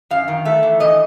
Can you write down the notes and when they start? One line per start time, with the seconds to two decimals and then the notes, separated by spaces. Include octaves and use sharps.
0.11 F#2 F5
0.28 D#3
0.45 A3 E5
0.63 E3
0.80 E3 D#5